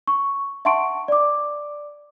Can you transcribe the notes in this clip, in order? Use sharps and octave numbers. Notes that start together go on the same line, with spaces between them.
C#6
E5 F#5 A5 C6 C#6 D7
D5 D6